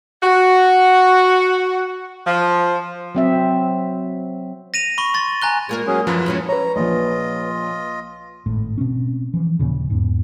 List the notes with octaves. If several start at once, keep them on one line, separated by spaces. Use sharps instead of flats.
F#4
F3
F#3 C4 E5
A#6 D#7 F7
B5 C#6 G7
C6 A6
G#5 A#5 F#6 G7
A#2 G#3 A#3 A#4
F#3 C#4 G#4
F#2 E3 F3 B4
G#3 C#4 E4
B4 C#5 A#5
A#1 A#2 F3 F4 D#5
G#1 A2
B2 C4 C#4
E3 F3
D#2 A#2 C#3
E2 G#2